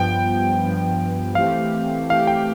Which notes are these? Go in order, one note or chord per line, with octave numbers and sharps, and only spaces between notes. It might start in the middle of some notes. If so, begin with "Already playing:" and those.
Already playing: G2 F3 B3 G5
G2 F3 B3
E3 A3 C4 G4 F5
E3 A3 C4 G4 F5
G5